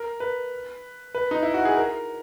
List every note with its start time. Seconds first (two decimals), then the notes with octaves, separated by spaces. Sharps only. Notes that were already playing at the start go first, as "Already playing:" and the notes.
Already playing: A#4
0.20 B4
1.15 B4
1.31 D#4
1.43 E4
1.54 F#4
1.65 G#4
1.77 A#4